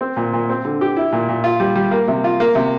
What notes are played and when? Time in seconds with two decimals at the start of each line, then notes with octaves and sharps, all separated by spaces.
0.01 C4
0.16 A#2
0.33 A#2
0.49 C4
0.65 D3
0.81 G4
0.97 E4
1.12 A#2
1.29 A#2
1.44 F4
1.60 G3
1.75 G3
1.91 A#3
2.08 C3
2.24 F4
2.40 A#3
2.55 C3